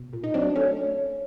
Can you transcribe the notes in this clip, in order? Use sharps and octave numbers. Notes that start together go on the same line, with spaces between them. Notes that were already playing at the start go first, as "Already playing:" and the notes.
Already playing: B2
A#2
D#4
F#3 C4 D4
A3 C#4